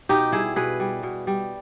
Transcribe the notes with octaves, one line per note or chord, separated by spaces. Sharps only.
B2 D#4 G4
G3 E4 G#4
B2 G#4 B4
G3
B2
G3